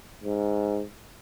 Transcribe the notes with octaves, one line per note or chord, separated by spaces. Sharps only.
G#2